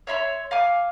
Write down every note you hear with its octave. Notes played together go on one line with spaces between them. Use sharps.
C#5 E5 B5 C6
F5 G#5 D6